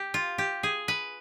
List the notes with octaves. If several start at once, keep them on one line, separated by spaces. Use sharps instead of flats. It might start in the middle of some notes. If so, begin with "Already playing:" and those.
Already playing: G4
F4
G4
G#4
B4